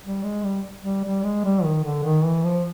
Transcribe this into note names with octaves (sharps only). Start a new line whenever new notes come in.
G3
G#3
G3
G3
G3
G#3
G3
D#3
D3
D#3
E3
F3